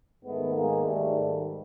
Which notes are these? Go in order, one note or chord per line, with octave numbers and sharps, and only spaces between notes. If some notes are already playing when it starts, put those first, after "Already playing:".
G#2 D#3 A3 B3
G#3 A#3
G#2 D#3 G3 A3